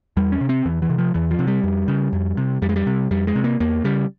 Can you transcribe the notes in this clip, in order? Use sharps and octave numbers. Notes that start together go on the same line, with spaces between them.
E2 G3
C#4
C3
C4
E2 E3
E3
C3
F3
E2 E3
F3
C3
G3
F2
C#3
F2
C3
F2 G3
G#3
G3
C3
F2 G3
G#3
C3
A#3
E2 A#3
C#3 G3